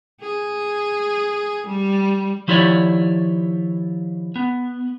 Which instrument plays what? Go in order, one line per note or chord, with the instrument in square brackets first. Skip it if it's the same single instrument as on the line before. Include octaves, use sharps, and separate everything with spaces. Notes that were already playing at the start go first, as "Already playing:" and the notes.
[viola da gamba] G#4
G3
[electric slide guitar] D#3 F3 E4 G4 C#5 D5
B3